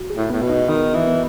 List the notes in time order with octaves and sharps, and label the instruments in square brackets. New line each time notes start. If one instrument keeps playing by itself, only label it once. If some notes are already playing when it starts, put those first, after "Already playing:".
Already playing: [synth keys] F#4
G#4
[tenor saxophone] A2
[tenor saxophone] A2 [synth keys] B3 B4
[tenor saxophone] B2
[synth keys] D#4 D#5
[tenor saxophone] D#3 [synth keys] D#4 D#5
[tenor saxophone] E3
[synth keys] B3 B4